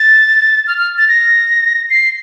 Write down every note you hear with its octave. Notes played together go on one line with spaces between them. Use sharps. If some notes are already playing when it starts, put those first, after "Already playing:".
Already playing: A6
F6
F6
A6
A#6
C7